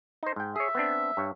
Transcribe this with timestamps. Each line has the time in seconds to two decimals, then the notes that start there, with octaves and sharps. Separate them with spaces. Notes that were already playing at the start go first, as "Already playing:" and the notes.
0.23 D#4 C5
0.36 G#2 G5
0.56 G#4 C#5 E5
0.75 B3 C4 D4
1.17 G2 C#5